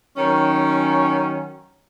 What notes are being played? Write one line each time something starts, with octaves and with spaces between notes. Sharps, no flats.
D#3 F#3 C#4